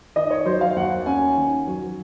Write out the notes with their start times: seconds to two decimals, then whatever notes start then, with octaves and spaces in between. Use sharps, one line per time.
0.16 D#3 D#5
0.30 C#5
0.45 F#3 C5
0.61 F5
0.76 D#2 F#5
1.06 C#4 G#5
1.37 D#3
1.67 F#3